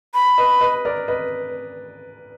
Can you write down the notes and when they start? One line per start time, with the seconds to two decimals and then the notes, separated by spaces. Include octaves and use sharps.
0.14 B5
0.38 B4 D#5
0.61 B4 D#5
0.85 A#4 D5
1.08 B4 D#5